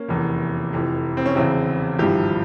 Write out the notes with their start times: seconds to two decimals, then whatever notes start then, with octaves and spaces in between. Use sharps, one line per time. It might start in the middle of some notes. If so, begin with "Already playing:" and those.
Already playing: A#3 C#4
0.08 F1 E2 E3
0.73 F1 F2 E3
1.17 C4
1.26 C#4
1.35 E1 E2 C#3 C4 E4
1.99 G#1 G2 F3 E4 G4